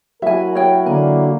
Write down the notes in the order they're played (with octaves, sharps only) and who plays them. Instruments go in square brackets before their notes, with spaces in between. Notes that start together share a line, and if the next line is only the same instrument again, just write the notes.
[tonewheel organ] F#3 E4 F#4 [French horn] A#4 [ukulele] E5 G#5
[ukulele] C#5 G5
[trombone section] D3 A#3 D4 [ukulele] G#5